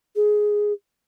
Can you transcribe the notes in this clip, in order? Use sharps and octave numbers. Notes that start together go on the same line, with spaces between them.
G#4